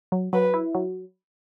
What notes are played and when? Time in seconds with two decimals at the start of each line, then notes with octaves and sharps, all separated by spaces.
0.12 F#3
0.33 F#3 B4
0.54 E4
0.75 F#3